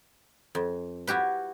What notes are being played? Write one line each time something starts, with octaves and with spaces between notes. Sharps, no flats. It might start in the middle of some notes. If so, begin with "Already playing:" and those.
F2
E4 F#4 G4 B4